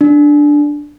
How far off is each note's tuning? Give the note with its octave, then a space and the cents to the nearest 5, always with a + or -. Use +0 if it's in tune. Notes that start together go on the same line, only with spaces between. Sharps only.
D4 +0